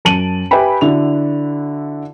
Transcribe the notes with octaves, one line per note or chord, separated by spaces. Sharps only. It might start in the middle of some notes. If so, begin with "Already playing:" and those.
F#2 A5 D7 D#7 F#7
G4 B4 E5 G5 G#5 B5
D3 E4 F#4 F7